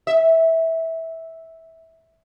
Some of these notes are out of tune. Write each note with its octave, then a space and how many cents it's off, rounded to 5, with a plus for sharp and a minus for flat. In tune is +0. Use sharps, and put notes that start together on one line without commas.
E5 -15